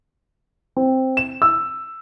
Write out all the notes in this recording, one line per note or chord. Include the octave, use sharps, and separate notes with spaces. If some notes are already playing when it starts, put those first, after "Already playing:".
C4
E7
E6